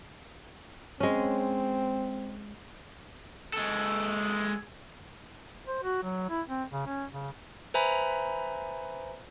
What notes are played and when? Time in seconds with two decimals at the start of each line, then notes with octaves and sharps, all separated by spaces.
1.00 G#3 C4 C#4
3.54 G#3 A4
5.67 C5
5.83 F#4
6.03 F#3
6.30 E4
6.48 C4
6.71 C#3
6.86 C#4
7.10 C#3
7.74 B4 C5 E5 G#5 A#5 B5